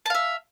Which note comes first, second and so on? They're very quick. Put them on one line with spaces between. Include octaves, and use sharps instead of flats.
A5 F5 E5